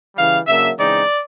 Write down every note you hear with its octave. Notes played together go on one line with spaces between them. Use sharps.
C#3 E3 G3 F5
C#3 F#3 A#3 D4 E5
C#3 E3 G#3 C4 D#4 D5